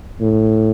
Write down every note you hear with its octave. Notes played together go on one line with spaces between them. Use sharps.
A2